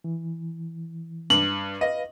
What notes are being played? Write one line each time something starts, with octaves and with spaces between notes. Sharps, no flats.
E3
G2 F#7
B4 D#5 F5